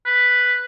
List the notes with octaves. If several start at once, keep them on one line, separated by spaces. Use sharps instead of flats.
B4